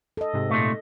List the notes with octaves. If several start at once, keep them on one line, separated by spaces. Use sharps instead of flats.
A4 D#5
G#2 C3
A#2 A3